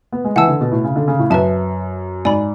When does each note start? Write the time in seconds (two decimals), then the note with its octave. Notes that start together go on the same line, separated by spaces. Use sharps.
0.12 B3
0.24 G#3
0.36 E3 F#5 A5 E6
0.48 D3
0.61 B2
0.72 A2
0.84 C#3
0.96 D3
1.08 C#3
1.19 A2
1.30 F#2 B4 E5 A5
2.25 G#2 D5 G#5 B5